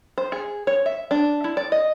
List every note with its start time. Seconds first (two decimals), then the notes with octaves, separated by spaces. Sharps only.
0.18 C5
0.32 G#4
0.67 C#5
0.86 E5
1.11 D4
1.44 E4
1.57 D5
1.72 D#5